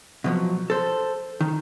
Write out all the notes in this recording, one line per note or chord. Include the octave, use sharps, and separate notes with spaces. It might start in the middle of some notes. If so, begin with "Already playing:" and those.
B2 F3 F#3
A4 C5
D#3